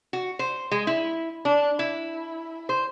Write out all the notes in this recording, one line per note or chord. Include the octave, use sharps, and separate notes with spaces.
F#4
C5
G#3
E4
D4
E4
C5